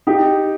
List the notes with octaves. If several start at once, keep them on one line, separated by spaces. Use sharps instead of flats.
D#4 G4